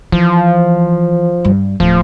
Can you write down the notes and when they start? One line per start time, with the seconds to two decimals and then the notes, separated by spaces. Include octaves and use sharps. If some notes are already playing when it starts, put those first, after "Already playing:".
0.12 E3 F3
1.45 G2 G3
1.80 D1 F3